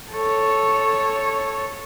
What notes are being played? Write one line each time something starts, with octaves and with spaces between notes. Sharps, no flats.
A4 C#5